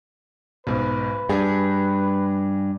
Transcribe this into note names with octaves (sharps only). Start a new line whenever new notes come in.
B1 G#2 B4
G2 G#4